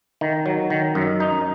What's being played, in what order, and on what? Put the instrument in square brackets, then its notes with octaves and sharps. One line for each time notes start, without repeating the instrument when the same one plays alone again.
[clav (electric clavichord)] D#3
F#3
D#3
F#2
D#4